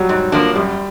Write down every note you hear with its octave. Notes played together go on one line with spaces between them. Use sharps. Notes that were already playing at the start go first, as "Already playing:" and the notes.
Already playing: F#3 G3
G#2
F3 A#3 D4
F#2 G3